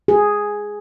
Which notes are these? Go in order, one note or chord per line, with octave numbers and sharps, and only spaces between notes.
G#4